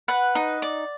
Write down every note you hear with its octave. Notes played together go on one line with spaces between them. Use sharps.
B4 F#5
D#4
D5